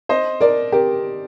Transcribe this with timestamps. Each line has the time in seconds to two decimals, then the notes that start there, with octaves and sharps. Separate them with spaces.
0.09 C5 D#5
0.41 A#4 D5
0.72 G4 A#4